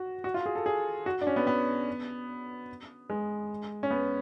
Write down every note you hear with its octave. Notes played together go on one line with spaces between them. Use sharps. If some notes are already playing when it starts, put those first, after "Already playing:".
Already playing: F#4
F#4
F4
G#4
A4
G#4
F#4
D4
C#4
B3
B3
G#3
C#4
B3